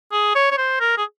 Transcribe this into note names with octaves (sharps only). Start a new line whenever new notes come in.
G#4
C#5
C#5
C5
A#4
G#4